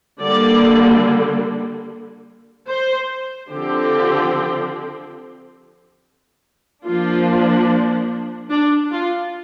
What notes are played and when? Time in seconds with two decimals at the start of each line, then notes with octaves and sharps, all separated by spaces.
0.21 D3 G3 A#3 D5
2.70 C5
3.53 D3 F3 C4 G4
6.85 F3 A#3 D4 F4
8.51 D4
8.92 F4